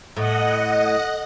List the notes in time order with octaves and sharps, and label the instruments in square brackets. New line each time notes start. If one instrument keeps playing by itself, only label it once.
[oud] A2 [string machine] D#5 F#5